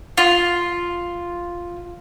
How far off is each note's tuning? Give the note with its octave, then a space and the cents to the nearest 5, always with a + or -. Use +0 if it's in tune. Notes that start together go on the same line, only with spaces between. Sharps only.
F4 +0